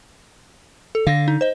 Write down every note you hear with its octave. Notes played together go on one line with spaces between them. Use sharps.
A4
D3 F5 A#6
D#4
C5 D#5